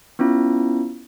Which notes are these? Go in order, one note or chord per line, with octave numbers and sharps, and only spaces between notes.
B3 C#4 E4 F4